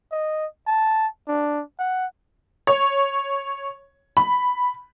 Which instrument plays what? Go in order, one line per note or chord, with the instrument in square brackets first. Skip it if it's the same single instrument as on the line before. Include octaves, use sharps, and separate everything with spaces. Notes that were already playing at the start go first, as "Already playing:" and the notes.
[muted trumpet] D#5
A5
D4
F#5
[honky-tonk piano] C#5
B5